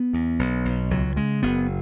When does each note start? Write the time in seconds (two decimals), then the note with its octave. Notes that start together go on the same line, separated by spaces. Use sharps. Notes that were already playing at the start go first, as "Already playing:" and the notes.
Already playing: B3
0.13 E2
0.39 B1
0.65 B1
0.91 C#2 F#3
1.16 C#3 G#3
1.43 F#1 B3